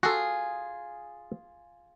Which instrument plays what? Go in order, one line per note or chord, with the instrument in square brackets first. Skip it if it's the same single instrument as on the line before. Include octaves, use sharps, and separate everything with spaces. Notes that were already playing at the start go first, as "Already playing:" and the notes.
[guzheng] F4 G#4 [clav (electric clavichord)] F#4 A4